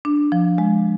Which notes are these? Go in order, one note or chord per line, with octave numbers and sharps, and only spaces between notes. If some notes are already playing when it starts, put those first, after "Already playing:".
D4
F3
G#3